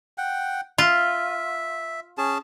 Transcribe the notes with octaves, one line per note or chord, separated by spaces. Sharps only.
F#5 G5
F4 E5
C#4 G#4 A5